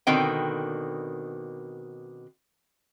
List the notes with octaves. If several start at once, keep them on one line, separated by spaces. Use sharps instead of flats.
B2 D3 D#3 C4 G5